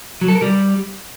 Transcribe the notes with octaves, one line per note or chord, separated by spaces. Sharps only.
F#3
A4
A#4
G3